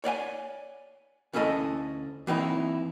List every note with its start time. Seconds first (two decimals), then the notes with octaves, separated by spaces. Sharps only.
0.04 C#5 D5 F5 G#5
1.33 D2 C#4 E4 A4 D#5
2.27 E3 C4 D#4 E4